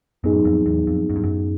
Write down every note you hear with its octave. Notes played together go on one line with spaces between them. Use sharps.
F#2 A2 F#3 B3 D#4 G#4
F2
E2
F2
F#2
G2
F#2